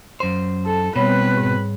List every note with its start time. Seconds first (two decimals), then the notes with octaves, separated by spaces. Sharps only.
0.20 F#2 C5
0.66 A4
0.96 B2 G3 C4 B4 C#5 B5
1.37 G#2